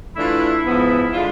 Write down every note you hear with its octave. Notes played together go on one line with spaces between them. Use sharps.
E3 A3 D4 E4 F4 E5
G#2 F3 B3
D3 G#3 D4 F4